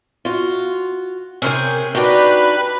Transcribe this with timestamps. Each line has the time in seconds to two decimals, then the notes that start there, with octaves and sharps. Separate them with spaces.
0.25 F4 F#4
1.42 C3 C#4 G#4 A#4 C5
1.95 D4 D#4 F#4 G4 B4 D5